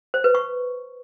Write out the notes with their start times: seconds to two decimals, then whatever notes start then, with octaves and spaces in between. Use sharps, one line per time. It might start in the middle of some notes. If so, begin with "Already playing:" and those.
0.14 C5
0.24 B4
0.35 C#6